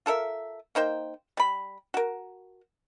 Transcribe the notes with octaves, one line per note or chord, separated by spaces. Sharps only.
F4 A4 A#4 E5
A#3 D#4 C5 G5
G3 B5
F#4 A#4